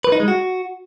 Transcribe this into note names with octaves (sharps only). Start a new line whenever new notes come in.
B4
D#4
G#3
F#4